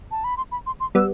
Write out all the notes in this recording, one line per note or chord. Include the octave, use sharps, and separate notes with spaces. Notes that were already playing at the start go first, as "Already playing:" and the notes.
A5
B5
C6
B5
C6
C6
G3 B3 E6